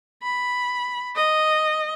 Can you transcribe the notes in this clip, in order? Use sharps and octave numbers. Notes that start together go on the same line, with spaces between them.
B5
D#5